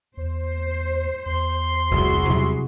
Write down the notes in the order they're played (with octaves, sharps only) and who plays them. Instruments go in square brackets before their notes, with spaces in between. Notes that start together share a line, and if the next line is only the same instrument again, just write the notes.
[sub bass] E2 [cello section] C5
[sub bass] E2 [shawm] C6
[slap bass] F1 C2 A2 [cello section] E4 F#4 G#4
[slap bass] C3 F#3 G3